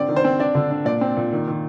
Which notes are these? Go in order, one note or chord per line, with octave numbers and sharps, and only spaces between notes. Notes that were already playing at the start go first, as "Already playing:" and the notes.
Already playing: D3 C4 D5
D#3
C5
C4
D4 D5
D3
D4
A#2 D5
C4
A#2
D#3
D#3